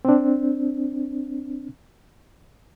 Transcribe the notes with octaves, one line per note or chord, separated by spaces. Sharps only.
C4 D4